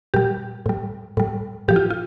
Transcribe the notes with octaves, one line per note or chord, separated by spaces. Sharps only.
A#2 G3 G4
A2 G3
A2 G3
A2 F3 G4
F4
F4